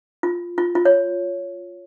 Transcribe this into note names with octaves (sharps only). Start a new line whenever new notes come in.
F4
F4
F4
C#5